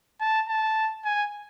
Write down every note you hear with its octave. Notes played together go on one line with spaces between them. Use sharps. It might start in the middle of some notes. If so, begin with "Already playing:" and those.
A5
A5
G#5